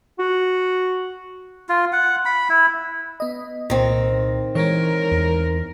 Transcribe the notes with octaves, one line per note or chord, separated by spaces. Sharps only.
F#4
F4
F#5
B5
E4
B3 D#5
C2 A#2 D#3 C4 A#6
E3 G#3 A#4 C#5
E2